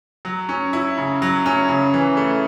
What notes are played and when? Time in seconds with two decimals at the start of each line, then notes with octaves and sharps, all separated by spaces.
0.25 F#3
0.49 C#4
0.73 E4
0.98 C#3
1.22 F#3
1.46 C#4
1.69 C#3
1.94 E3
2.17 A3